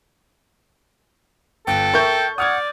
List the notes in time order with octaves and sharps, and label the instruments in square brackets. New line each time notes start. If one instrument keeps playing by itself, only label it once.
[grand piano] G1 [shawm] A4 [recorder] G5
[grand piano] A#4 E5 [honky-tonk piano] C#6 G6
[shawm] D5 [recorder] F#5 [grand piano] D#6 F6 G#6